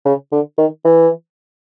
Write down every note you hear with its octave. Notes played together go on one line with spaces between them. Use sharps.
C#3
D3
D#3
E3